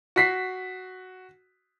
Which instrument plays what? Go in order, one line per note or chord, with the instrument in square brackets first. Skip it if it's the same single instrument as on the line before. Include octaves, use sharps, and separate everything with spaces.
[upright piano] F#4 B6 C7